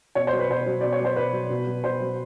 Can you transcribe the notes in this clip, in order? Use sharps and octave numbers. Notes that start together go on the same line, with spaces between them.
B2 C#5
C5
F#3
B4
B2 C5
F#3
B2 D5
C#5
F#3 C5
B2 B4
F#3
B2
F#3
B2 C5
F#3